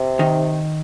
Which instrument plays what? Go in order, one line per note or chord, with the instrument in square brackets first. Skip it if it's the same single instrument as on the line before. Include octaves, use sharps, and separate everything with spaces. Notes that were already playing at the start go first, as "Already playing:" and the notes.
Already playing: [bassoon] C3
[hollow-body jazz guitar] D#3 D#4